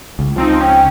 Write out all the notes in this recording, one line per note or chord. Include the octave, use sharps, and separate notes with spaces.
C#2
F3 C4 D#4
C#4 G5